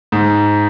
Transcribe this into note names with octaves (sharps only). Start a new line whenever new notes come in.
G#2